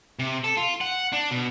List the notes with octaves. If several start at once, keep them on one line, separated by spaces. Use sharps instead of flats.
C3
A4
F4
F#5
D4
B2